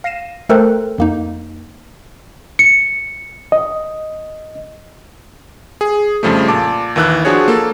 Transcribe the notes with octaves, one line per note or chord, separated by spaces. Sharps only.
F5 A#6 C7 D#7 E7
A3 A4 A#4 C5 G5 F#6
F2 A#3 D#4
C#7
D#5
G#4
F2 C#3 F3 G3 A3
A#2 A5 D6
D#2 D#3 E3 E6 F#6
F3 D4 F#4 G#4 C#5
A#3 A4